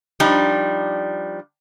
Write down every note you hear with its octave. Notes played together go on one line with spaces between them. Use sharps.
F3 G3 D4 D#4